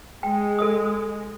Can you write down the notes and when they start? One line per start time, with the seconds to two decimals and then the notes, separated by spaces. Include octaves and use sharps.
0.23 G#3 G5
0.59 A4 D#5 D#6